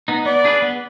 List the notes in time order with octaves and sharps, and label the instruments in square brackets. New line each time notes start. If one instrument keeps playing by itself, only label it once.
[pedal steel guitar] B3 D#4
[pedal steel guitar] B3 [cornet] D5
[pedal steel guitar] D4 G#4 B4
B3